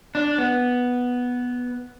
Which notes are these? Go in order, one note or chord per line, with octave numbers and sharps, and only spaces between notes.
D4
B3